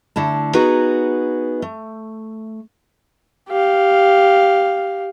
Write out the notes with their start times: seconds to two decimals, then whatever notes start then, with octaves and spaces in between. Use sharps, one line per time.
0.16 D3 A3 E4 A5
0.54 B3 D#4 F#4 G#4 B4 A#5
1.62 A3
3.50 G4 F5